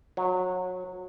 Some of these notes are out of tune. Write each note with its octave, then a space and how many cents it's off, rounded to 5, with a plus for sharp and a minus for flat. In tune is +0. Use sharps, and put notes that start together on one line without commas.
F#3 -20